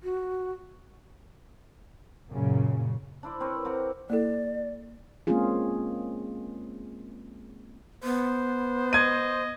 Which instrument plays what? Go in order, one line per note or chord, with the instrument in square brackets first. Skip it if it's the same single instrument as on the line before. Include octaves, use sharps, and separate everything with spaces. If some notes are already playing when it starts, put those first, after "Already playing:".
[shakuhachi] F#4
[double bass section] F#2 A#2 C#3
[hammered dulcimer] D4 E4 C5 D5
C4 A#4 B4 C#5
C3 F#5 A#5 D6
[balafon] A#3 E4 A4 [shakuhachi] D5
[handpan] G#3 A#3 C4 C#4 F4 G#4
[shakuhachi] B3 [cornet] C5
[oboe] D#5 [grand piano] G#6 D#7